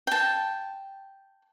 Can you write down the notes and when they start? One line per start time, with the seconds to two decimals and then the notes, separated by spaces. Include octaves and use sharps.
0.07 G5 A5